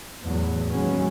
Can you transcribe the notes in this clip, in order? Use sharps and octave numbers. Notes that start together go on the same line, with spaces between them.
E2 A2 F#3
D#2 F#3 G#3 B3 C#4